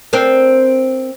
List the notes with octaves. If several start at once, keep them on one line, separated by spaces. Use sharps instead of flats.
C4 D4 A#4